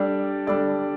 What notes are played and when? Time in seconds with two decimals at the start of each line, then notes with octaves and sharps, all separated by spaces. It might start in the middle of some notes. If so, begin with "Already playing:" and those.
Already playing: G3 D4 A4 D5
0.47 G3 D4 A4 D5